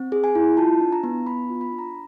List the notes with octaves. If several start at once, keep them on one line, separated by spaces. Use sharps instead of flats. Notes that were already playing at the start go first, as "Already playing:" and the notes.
Already playing: C4
G#4
G#5
E4
F4 A5
D4
A#5
B3
B3 B5
F4
B5
D4
A#5